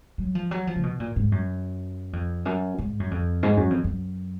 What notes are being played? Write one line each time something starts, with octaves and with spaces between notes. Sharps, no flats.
F#3
F3
F#3
F3
C#3
B2
A#2
G#2
F#2
F2
F#2
G#2
F#2
F2
G#2
F#2
F2
F#2